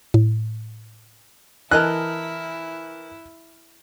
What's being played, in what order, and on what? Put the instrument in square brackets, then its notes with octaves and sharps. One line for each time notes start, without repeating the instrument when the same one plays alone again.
[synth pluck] A2
[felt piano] E3 A#4 F6 [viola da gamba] E4 [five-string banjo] A4 D#5 G#5 [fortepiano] F#6